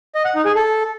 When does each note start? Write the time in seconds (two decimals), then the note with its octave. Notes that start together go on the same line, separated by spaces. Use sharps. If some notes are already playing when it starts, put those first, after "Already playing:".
0.15 D#5
0.25 F#5
0.35 D#4
0.45 G#4
0.55 A4